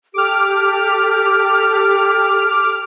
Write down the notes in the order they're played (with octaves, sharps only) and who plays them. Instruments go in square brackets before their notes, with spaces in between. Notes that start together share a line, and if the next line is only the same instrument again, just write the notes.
[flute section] G4 A4 [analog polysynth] D6 F6